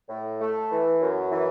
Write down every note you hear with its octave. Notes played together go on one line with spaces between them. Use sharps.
A2
A3
E3
F#2
E3